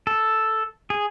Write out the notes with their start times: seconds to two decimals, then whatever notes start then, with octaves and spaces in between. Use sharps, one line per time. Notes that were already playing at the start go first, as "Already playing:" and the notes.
0.07 A4
0.90 G#4